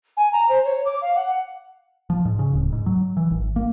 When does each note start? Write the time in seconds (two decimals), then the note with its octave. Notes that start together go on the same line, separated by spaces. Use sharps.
0.17 G#5
0.33 A#5
0.49 C5
0.65 C#5
0.86 D6
1.02 F5
1.16 F#5
2.10 F3
2.25 G#2
2.39 C#3
2.53 D1
2.72 G#2
2.86 F#3
3.17 E3
3.31 G#1
3.56 A#3